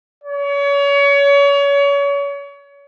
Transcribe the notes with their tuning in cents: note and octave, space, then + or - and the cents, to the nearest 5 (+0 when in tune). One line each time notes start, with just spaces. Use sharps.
C#5 +30